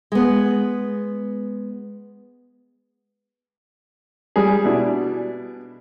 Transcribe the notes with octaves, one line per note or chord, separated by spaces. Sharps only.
G#3 B3
G3 G#4
B2 D4 E4